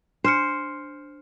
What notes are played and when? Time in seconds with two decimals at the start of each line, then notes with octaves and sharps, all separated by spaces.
0.24 D4 C5 F6 C#7